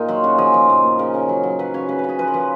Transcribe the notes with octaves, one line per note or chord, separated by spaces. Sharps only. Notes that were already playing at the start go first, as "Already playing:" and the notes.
Already playing: A#2 D#4 G#4 A#4
F#3 F4
C#3 F#4
F3 G#4
F3
A#2
A#2
C#3 A#4
C#3
F#3
F#3
F#3 B4
C#3 C#5
C#3 B4
B4
C#3
G#4
F3 B4
A#4
F3 B4